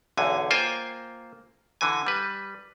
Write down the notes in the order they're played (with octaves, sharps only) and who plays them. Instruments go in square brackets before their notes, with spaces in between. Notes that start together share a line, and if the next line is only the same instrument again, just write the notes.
[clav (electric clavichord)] B1 E2 D3 G#5
A#3 F4 C5 G5 G#5
D3 E3 G#5
G3 B4